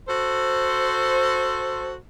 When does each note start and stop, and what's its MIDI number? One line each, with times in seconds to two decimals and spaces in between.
0.08 1.94 66
0.08 1.94 69
0.08 1.94 72